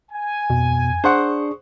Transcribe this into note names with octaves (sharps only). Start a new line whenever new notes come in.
G#5
F2 B2
D4 G#4 C5 F#5 C#6 D#6